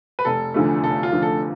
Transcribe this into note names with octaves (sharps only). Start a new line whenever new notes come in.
B4
F1 A4
E2 D3 F3 A3
F1 A4
F4
E2 D3 F3 A3
A4